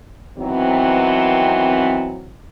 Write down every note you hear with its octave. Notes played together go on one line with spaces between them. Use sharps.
D#3 E3 F#3 B3 C4